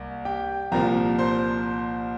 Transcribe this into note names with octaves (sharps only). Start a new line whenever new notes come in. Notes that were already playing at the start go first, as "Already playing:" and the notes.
Already playing: C2 A#3
G4 G5
C2 A#2 F3 A#4 A#5
C5 C6